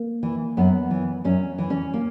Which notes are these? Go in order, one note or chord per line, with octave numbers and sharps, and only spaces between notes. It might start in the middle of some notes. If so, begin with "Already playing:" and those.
Already playing: A#3
E3
F#2 B3
E3
F#2 C#4
E3
C#4
A#3